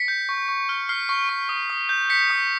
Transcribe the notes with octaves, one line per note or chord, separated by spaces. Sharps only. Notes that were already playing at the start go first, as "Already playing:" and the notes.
Already playing: B6 C#7
G6
C#6
C#6
F6
F6 C7
C#6
C#6
D#6
D#6
G6
G6 B6 C#7
D#6